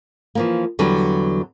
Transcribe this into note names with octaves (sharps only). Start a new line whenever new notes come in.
E3 F3 A#3
E2 D3 F#3 G3 B4